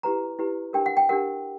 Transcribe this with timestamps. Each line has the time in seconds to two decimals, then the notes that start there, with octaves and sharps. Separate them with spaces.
0.03 E4 G4 B4 A#5
0.39 E4 G4 B4
0.73 D4 G4 A#4 G5
0.86 F#5
0.97 G5
1.09 D4 G4 A#4 F#5